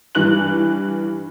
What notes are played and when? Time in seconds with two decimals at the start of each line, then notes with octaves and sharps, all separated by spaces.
0.15 G2 E3 F#6 F#7